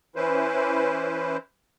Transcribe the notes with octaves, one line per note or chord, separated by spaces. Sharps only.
E3 C#4 E4 B4 C5